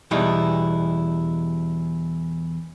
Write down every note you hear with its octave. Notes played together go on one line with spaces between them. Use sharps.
E2 B2 G3 D#4 E4